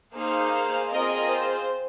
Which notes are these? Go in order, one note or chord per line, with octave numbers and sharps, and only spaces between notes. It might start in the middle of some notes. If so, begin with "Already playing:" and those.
A#3 D#4 G#4 C5 F5
C4 F4 G#4 A#4 D#5
C5